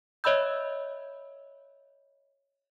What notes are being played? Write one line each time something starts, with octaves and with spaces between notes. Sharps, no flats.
C#5 D#5 E5 B5 E6 G6